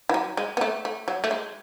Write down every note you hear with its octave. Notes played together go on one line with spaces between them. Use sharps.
E3
F#3
G#3
B3
A3
A3
F#3
A3
G#3